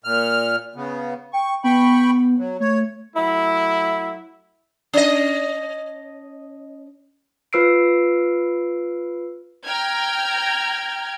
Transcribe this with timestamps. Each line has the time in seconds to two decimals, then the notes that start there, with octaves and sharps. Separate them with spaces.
0.04 A#2 F6
0.76 C#3 B3
1.33 G5 C#6
1.64 B3 G5 B5 C#6
2.38 F#3
2.60 A3 C#5
3.16 F#3 A3 E4
4.93 C#4 D#5
7.53 F4 B4 E6 C7 D7
9.65 G5 A#5 F6 G6 G#6